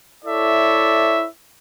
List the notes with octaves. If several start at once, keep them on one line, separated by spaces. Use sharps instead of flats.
E4 A4 C#5 D5 E5